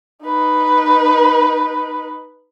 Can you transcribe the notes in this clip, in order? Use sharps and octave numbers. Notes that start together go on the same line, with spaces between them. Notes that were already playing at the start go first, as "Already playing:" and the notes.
D#4 B4